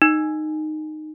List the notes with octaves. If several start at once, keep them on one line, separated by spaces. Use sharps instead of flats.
D#4